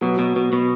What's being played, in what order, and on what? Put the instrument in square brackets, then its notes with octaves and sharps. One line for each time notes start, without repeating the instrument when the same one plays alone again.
[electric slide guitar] B2 [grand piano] F#3
[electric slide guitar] B2
B2
B2